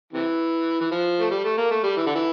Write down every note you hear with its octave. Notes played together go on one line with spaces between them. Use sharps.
C3 E3
E3
F3
A3
G3
A3
A#3
A3
G3
E3
D3
E3